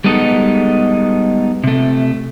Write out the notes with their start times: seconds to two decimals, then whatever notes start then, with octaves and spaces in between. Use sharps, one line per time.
0.04 G3 G#3 B3 D#4 A4
1.64 C3 A3